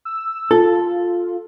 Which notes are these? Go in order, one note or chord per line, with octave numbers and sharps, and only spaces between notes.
E6
F4 A4